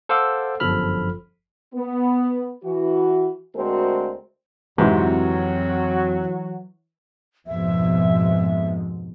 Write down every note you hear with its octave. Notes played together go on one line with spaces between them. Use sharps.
A4 C5 F5 F#5 D6 E6
G1 F#2 F3 A4 B5 F6
B3
E3 F#4
D2 G#3 C4 F#4 A#4 C5
F2 G#2 C3 E3 F#3 F#4
F2 G#2 B2 E5